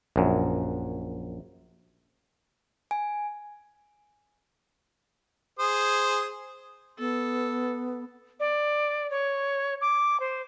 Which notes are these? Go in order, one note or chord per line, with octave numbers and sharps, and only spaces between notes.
A#1 F#2
G#5
G#4 C5 D#6
B3 A4
D5
C#5
D6
C5